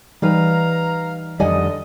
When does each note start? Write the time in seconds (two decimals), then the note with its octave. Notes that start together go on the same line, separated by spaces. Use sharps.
0.22 E3 G3 D#4 B4 F5 A#5
1.40 F2 D3 D#3 G3 D5 D#5 F#5 G#5